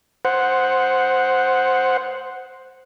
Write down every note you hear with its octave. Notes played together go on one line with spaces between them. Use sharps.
C5 F#5